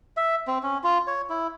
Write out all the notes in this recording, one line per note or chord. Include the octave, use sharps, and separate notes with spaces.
E5
C4
C#4
F4
C#5
E4